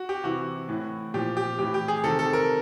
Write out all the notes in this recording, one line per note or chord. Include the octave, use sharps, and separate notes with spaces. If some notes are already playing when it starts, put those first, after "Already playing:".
Already playing: F#4
G4
C3 E3 F#4
A2 E3
A#2 F3 G4
G4
A2 E3 G4
G4
G#4
C3 D#3 A4
A4
A#4